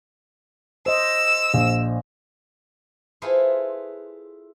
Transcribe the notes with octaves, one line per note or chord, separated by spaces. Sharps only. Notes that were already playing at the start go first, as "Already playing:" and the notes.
C5 D#5 E6
A#1
E4 F4 G#4 A4 B4 C5